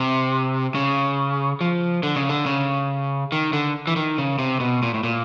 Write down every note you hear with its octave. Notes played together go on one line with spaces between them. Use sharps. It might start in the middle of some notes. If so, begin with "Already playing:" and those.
Already playing: C3
C#3
F3
D3
C#3
D3
C#3
D#3
D3
E3
D#3
C#3
C3
B2
A#2
A2
A#2